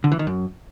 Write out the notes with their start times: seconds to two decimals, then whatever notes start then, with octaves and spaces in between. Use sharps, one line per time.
0.04 D3
0.12 E3
0.19 D#3
0.27 F#2